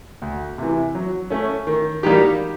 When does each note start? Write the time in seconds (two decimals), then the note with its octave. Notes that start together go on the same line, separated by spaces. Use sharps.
0.22 D2
0.58 C3 E3
0.95 F#3
1.30 A3 C#4
1.67 D#3
2.03 G3 A#3 D#4 G4